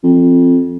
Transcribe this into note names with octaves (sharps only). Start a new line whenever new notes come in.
F2